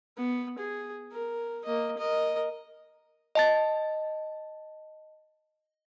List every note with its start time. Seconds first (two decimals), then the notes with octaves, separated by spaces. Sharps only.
0.18 B3
0.59 G#4
1.12 A#4
1.65 A#3 D#5
1.97 A#4 D#5
3.35 D#5 A5 A6